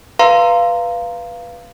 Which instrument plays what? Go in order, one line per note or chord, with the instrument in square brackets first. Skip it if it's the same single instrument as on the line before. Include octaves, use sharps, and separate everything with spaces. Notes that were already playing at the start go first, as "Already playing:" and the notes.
[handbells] B4 F5 A#5 C6